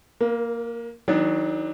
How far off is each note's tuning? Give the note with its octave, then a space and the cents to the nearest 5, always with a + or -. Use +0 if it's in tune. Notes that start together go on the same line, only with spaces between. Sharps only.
A#3 +0 A#4 +40
D#3 +35 F#3 +0 D4 +30